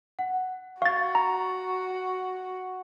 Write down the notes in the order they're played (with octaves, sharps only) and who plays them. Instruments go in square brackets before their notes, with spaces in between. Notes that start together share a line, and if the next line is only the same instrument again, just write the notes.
[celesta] F#5
[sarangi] F#4 [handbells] F5 A6 [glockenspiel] C#6
[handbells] A#5